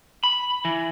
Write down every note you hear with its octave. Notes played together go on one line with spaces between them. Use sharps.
B5
E3